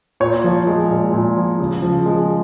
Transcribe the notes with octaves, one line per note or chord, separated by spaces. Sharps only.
A#2 C#5
F3
G#3
A#2
A#2
F3
C#3
F3
G#3